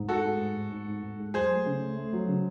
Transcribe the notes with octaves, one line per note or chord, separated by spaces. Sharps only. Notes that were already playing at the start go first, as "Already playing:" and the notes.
Already playing: G#2
G#3 F#4 A4
G#3
G#2
G#2
G#2
G#2
G#2
G#3
F#3 G#4 C5
A3
C#3
A3
A3
F#3
C#3